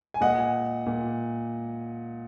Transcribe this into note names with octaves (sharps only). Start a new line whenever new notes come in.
G#5
A#2 D#5 F#5
A#2